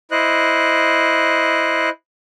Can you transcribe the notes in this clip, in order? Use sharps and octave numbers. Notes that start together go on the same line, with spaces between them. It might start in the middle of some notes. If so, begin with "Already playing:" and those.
E4 C5 D#5 F#6